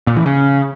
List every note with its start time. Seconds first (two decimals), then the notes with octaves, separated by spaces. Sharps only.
0.07 A#2
0.16 E3
0.26 C#3